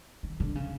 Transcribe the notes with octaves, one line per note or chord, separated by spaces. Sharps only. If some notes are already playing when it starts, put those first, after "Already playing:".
D#3
D3
C#3